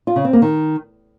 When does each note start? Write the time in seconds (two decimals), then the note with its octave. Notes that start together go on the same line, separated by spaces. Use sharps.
0.07 F4
0.16 C#3
0.25 C4
0.33 A#3
0.42 D#3